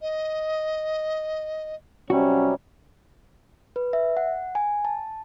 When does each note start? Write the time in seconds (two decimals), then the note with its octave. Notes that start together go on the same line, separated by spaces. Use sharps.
0.02 D#5
2.10 C3 F#3 G3 C#4 F#4
3.76 B4
3.93 E5
4.17 F#5
4.55 G#5
4.85 A5